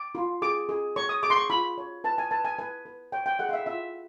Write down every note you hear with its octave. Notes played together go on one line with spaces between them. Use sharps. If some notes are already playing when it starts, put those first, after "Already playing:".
Already playing: D6
F4
G#4 D6
G#4
C#5 C#6
D#6
G#4 D6
C6
C#6
F4 B5
C#5
B4 A5
G#5
B4 A5
G#5
B4 G#5
B4
C#5 G5
G5
G#4 F#5
F5
E5
F4 E5